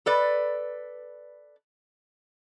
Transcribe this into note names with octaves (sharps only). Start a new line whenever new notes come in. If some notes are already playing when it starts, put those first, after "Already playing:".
A4 B4 D5